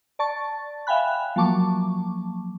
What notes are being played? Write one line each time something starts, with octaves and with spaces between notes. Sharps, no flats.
D5 A5 C#6 A6
E5 F5 G5 G#5 B5 F#6
F3 F#3 A#3 A5 C#6 D6